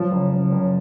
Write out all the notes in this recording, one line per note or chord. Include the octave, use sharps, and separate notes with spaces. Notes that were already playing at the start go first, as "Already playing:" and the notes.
Already playing: F3 F#3
F#1
F#1
F#1